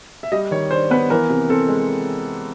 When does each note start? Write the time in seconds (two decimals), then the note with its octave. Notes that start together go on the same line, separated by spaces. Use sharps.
0.23 E5
0.32 G3 D#5
0.51 D#3 C#5
0.71 D4 C5
0.91 B3 B4
1.10 E3 A#4
1.29 C3
1.49 C4 A4
1.69 G#3